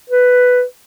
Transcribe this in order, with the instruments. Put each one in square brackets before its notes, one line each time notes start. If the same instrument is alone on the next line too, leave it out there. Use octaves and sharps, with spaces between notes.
[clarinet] B4